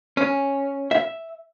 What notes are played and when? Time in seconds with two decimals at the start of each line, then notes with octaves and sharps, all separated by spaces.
0.17 C#4
0.91 E5